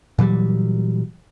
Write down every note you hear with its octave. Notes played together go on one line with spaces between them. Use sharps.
A#2 E3 F#3 G3